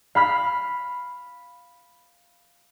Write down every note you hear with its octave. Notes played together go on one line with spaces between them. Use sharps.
F5 B5 F6 B6